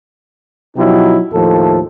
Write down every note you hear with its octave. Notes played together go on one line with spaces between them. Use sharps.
B2 F3 F#3 D#4 E4 G4
D#2 A2 F3 A4